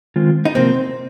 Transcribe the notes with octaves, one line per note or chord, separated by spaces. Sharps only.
D#3 G#3 C4 F4
D#4
C3 F3 A#3 C4